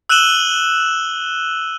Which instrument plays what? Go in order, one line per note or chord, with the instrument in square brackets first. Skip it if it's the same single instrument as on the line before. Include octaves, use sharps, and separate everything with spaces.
[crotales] E6 F#6 D#7 E7 F#7 G7